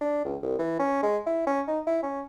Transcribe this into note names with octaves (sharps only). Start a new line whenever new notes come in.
D4
C#2
C2
E3
C#4
G#3
E4
C#4
D#4
E4
C#4